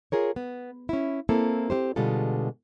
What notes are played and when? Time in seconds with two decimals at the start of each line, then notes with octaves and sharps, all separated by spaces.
0.12 F4 G#4 A#4 C#5
0.36 B3
0.89 C#4 E4
1.29 A#3 C4 E4 A4
1.70 C4 C#4 G4 C5
1.96 B2 D3 G3 G#3 F4 A4